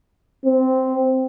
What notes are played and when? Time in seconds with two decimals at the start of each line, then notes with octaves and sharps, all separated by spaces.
0.45 C4